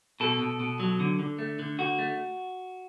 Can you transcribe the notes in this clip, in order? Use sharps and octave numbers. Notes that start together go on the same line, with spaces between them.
B2 A4
B2
B2
F#3
D3
D3
A3
D3
D3 F#4
A3